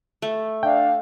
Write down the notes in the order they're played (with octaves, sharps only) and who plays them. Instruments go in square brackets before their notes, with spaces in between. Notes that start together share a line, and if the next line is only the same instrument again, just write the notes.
[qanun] A3
[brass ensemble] D4 E5 F5 [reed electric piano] G5